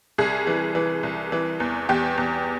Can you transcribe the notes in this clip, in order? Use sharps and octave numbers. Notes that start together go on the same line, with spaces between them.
C2 G#4
E3
E3
C2
E3
E2
E2 G4
E2